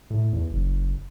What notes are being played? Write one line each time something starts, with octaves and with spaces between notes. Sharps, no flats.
A2
E2
F#1